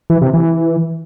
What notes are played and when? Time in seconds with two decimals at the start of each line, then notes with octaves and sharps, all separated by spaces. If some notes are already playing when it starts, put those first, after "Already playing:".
0.10 E3
0.22 C3
0.34 E3